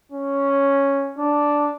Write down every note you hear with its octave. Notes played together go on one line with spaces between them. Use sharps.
C#4
D4